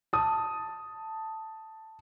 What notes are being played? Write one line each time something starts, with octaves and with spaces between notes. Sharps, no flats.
A5 D#6